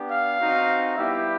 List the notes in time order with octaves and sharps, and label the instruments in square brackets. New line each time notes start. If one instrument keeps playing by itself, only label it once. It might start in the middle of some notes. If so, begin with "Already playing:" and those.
Already playing: [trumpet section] B3 D4 G4
F5
C4 D#4 F#4
G3 B3 E4 G4 E5